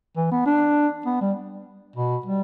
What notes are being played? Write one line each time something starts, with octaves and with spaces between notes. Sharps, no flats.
E3
B3
D4
B3
G3
B2
G3